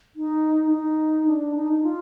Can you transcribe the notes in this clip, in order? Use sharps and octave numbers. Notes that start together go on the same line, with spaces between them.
D#4
D#4
D4
D#4
D#4
F4